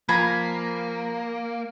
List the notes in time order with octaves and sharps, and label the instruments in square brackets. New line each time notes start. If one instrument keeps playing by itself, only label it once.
[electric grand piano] F3 [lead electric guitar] A#3 [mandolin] G#5 A#5 B5